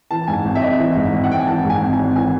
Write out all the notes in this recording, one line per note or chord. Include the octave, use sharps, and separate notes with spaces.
E3 A5
G#2 G#5
G#1
E5
G#1 D#5
E3
G#2
G#1
F#5
G#1 G5
G#5
E3 A5
G#2
G#5
G#1
G#5
G#1
E3 G#5